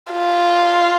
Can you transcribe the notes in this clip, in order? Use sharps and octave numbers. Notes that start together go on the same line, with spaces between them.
F4